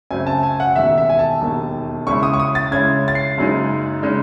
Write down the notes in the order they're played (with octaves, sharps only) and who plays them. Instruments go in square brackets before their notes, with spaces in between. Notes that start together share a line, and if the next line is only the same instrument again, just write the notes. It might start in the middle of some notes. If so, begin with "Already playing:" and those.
[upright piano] F#2 C#3 F#3 A3 C4 [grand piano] G#5
[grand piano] A5
G#5
F#5
[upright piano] E1 D#2 D#3 [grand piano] E5
[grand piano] E5
G#5
A5
[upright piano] E1 D#2 D#3
[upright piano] C#3 G#3 C#4 E4 [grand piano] C#6
[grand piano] D#6
C#6
D#6
A6
[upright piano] C#3 G#3 C#4 E4 [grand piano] G#6
[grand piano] A6
C7
[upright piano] F#1 F#2 C#3 G#3 D#4
C#3 G#3 D#4